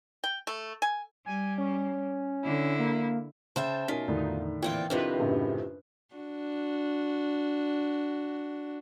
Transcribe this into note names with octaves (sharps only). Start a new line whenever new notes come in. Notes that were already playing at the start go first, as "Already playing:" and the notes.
G5
A3
G#5
G3 G#5
C#4
D3 E4
A#3
C#3 C5 E5 G5 A5
B2 C#4 D#4 F4 A#4 G#5 B6
E2 A2 D3 D#3 D#4
A#2 E3 C4 F4 G5
F2 C3 D#3 D4 E4 F4 B4 C5
A1 F#2 C#3
D4 F#4